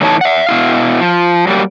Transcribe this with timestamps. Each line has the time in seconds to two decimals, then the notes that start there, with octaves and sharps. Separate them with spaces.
0.01 A2 E3 D#4 C#5 G#5 A5
0.21 E5 F#5
0.46 B2 E4 F5
1.01 F3
1.47 F#3 G3 A#3